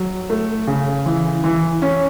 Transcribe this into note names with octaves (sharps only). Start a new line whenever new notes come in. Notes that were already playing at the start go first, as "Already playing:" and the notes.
Already playing: F#3
A3
C#3
E3
E3
C#4